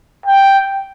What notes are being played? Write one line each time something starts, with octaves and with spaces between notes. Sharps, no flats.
G5